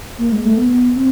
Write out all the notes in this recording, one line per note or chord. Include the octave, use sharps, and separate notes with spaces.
A#3
G#3
A3
B3
B3
C4